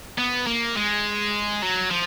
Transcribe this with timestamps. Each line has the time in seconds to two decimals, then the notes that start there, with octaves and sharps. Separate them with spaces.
0.18 B3
0.47 A#3
0.76 G#3
1.63 F#3
1.91 F3